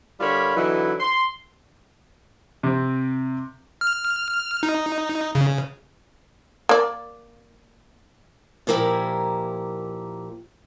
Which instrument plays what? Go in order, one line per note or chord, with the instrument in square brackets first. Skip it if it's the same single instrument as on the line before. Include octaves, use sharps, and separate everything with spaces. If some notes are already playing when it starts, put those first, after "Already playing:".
[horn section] D3 G3 F4 A#4 C#5 B5
D3 E3 F#3 D#4 E4
C6
[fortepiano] C3 C4
[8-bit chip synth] F6
D#4
C#3
[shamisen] A#3 D5
[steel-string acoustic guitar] A#2 F3 A#3 E4 G4 A#4